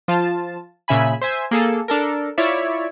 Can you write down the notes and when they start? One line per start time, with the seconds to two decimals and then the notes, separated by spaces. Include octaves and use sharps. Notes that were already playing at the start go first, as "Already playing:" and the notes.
0.08 F3 F4 A5
0.88 A#2 C#3 E5 G#5 B5
1.21 C5 E5 G#5
1.51 A#3 G#4 A4
1.88 D4 A4 A#4
2.38 E4 F4 C#5 D5 E5